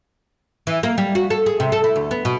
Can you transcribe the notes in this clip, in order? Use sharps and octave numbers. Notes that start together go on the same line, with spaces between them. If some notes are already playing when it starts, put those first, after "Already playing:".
E3
A#3
G3
F#4
A4
G#4
C3
A4
E4
D2
B3
B2